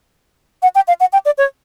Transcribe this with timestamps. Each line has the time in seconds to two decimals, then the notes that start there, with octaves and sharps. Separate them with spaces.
0.63 F#5
0.75 G5
0.88 F5
1.00 F#5
1.13 G5
1.25 D5
1.38 C#5